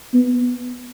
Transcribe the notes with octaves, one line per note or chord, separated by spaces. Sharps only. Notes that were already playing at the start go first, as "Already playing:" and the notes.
B3